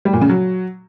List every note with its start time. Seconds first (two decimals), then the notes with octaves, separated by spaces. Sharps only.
0.05 G3
0.13 A#2
0.21 C#3
0.29 F#3